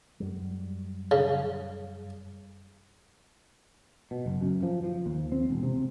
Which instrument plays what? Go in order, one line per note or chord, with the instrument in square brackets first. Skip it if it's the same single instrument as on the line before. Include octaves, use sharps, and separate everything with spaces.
[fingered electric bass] F#2 G3
[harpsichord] C#3
[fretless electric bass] B2
F#1
F#2
F3
F3
D#2
C4
E1
C3